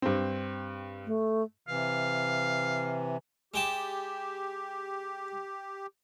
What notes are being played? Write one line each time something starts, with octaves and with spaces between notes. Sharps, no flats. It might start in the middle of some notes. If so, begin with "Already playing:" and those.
G2 C4
A3
C3 E3 F5
G#3 G4 G5 A5